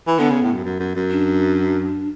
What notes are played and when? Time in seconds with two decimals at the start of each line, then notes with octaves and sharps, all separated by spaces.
0.07 E3
0.19 D3 B3
0.30 C#3
0.42 A2
0.53 F#2
0.65 F#2
0.80 F#2
0.96 F#2
1.11 D4